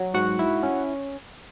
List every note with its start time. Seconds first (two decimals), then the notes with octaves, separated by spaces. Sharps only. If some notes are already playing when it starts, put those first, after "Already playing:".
Already playing: F#3
0.14 G#2 F#4 F#5
0.39 E4
0.63 C#4